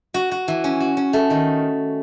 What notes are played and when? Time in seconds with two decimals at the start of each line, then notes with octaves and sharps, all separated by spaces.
0.14 F#4
0.31 F#4
0.48 E3
0.64 C#4
0.80 F#4
0.97 C#4
1.13 A3
1.30 D#3